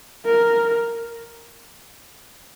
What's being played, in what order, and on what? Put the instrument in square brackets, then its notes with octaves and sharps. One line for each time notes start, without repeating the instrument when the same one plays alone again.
[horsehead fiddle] A#4